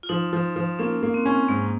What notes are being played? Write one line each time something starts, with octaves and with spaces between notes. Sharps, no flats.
F4
F3 D#4
F3
F3
A#3 C#4
A#3
C4
C#4
G#2 A#3